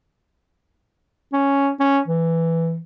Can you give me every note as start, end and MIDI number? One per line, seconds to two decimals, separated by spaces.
1.33 1.70 61
1.80 1.99 61
2.08 2.80 52